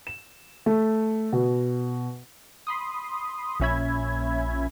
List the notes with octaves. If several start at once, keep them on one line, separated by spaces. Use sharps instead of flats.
E7
A3
B2
B5 C6 D#6
A#1 A#2 C#4 E5 B5 G#6